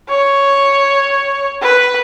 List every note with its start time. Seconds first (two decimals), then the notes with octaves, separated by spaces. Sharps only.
0.10 C#5
1.62 B4